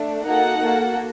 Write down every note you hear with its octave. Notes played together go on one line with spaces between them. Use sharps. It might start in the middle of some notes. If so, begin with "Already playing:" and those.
Already playing: A3 D4
A#3 D#4 F#4 A4 F#5
A#3 F#4 A4